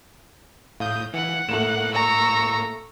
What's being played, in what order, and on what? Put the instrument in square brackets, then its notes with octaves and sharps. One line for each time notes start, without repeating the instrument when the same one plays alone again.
[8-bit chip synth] A2 D#6 G6 [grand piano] F5
[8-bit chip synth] E3 [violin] F#5 F#6
[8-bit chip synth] A2 A#3 [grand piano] A3 E7
[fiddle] A#5 [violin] C#6 E6